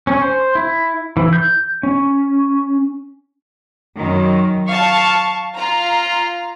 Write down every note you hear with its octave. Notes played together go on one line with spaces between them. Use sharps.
C#4
C5
E4
E3
G6
C#4
F#2 D#3
F5 A5 C#6
F4 A#5